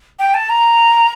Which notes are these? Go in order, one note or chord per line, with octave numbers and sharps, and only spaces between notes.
G5
A5
A#5